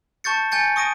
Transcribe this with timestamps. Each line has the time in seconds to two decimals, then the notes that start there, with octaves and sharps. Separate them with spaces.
0.24 A5 C#6 G6 A6 C#7
0.52 G#5 G6 A6 C#7
0.76 C#6 D#6 A#6 D7 D#7